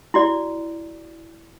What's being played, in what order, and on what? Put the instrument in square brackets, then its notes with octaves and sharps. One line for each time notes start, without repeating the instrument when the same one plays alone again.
[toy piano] E4 F#4 D5